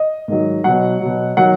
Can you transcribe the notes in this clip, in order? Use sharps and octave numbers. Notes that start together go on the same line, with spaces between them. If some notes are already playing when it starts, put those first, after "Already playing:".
Already playing: D#5
G#2 D#3 F#3
B2 F#3 F#5
B2 F#3
D#3 F#3 F#5